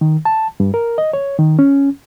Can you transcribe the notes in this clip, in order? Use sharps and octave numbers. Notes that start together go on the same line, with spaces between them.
D#3
A5
G2
A#4
D#5
C#5
D#3
C#4